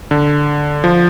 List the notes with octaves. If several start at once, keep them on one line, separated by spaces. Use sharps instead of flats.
D3
F3